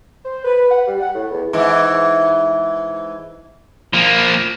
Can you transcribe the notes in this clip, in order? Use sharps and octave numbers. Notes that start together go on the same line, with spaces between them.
C5
B4
F#5
G3
F#5
A2
E2
G#2 E3
F3 A#3